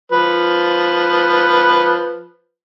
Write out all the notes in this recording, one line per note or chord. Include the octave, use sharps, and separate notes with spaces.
F3 B4